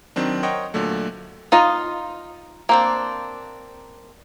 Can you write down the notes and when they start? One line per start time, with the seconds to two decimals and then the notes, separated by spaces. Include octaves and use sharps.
0.16 D#3 F#3 C4 D4
0.43 A#4 C5 C#5 D#5 F#5 G5
0.74 A#2 D3 F#3 A3
1.52 D#4 F4 D#5
2.69 A#3 C4 D4